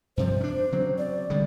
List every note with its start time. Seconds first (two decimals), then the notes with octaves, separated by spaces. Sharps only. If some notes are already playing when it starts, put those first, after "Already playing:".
0.17 G2 C3 F3 C5
0.40 C#4 D4
0.72 C#3 F#3 C4
0.98 D5
1.30 D3 G3 G#3